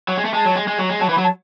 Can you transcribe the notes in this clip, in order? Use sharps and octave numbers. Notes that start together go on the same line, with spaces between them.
F#3
G#3
A3
G#3 A5
F#3
G#3
G#3
F#3
G#3
F#3 A5
E3
B5
F#3
A5